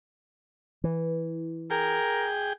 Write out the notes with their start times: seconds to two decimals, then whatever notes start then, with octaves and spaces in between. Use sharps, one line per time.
0.84 E3
1.70 G#4 A#4 G5